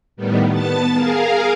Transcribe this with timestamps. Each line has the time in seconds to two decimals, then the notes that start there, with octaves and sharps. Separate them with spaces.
0.17 A2 D#3 G3 B3
0.51 B3 A5 A6
0.93 G#4 A#4 F5